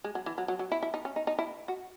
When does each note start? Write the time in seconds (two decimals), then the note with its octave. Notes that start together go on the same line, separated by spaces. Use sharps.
0.04 G#3
0.15 F#3
0.26 E3
0.38 F#3
0.48 F#3
0.59 F#3
0.72 E4
0.82 E4
0.94 D#4
1.05 C#4
1.16 D#4
1.27 D#4
1.39 E4
1.68 F#4